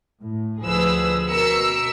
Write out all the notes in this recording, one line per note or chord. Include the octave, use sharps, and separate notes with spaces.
A2
D2 F3 G#4 B4 E6
B2 A#4 E6 B6 C#7